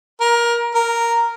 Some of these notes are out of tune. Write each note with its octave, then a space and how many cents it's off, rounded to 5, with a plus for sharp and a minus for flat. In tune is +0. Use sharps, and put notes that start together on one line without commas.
A#4 +20
A#4 -5